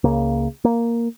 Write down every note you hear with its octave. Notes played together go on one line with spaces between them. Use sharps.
C#2 C#3 A#3
A#3